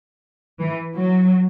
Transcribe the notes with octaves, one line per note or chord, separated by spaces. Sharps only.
E3
F#3